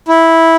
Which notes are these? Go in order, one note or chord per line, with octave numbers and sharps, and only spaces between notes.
E4